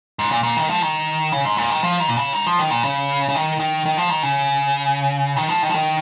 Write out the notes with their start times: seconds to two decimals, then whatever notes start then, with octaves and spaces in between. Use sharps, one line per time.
0.19 G#2
0.32 A#2
0.43 A#2
0.57 D#3
0.69 F3
0.82 D#3
1.32 C#3
1.45 G#2
1.57 A#2
1.70 D#3
1.83 F3
2.00 D#3
2.08 A#2
2.17 C#3
2.33 D#3
2.47 F3
2.59 D#3
2.71 A#2
2.84 C#3
3.29 C#3
3.35 D#3
3.60 D#3
3.86 D#3
3.97 F3
4.10 D#3
4.23 C#3
5.36 D#3
5.49 F3
5.63 D#3
5.69 F3
5.75 D#3